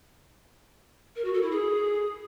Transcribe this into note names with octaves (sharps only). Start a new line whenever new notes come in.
A#4
F#4
A4
E4
G#4